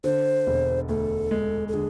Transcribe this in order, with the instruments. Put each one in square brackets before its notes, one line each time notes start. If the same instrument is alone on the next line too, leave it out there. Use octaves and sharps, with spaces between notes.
[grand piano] D3 [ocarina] C5
[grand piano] E1
[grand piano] D2 [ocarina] A4
[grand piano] G#3
[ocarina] A4
[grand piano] D3 [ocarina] G#4